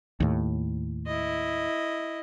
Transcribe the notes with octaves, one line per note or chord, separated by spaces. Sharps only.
D#2 A2
E4 D#5